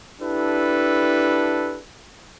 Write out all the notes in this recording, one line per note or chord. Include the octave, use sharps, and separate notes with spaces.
D4 E4 G4 A4 B4